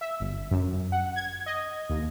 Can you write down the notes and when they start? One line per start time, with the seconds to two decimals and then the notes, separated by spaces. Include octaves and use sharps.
0.01 E5
0.20 G1
0.51 F#2
0.92 F#5
1.16 G#6
1.46 D#5
1.89 D#2